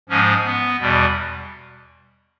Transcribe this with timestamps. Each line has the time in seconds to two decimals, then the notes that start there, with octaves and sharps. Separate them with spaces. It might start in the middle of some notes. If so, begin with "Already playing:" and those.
0.09 G#2 F3 G#3 C#4
0.45 B3
0.80 E2 B2 G3